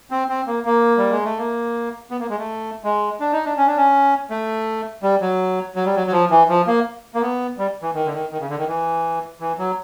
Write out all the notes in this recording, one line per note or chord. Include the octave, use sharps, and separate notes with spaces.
C4
C4
A#3
A#3
G3
G#3
A3
A#3
B3
A#3
G#3
A3
G#3
D4
D#4
D4
C#4
D4
C#4
A3
G3
F#3
F#3
G3
F#3
F#3
F3
E3
F3
A#3
A#3
B3
G3
E3
D#3
D3
D#3
D#3
C#3
D3
D#3
E3
E3
F#3